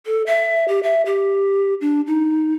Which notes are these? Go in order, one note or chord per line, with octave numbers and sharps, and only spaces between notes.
A4
E5
G4
E5
G4
D4
D#4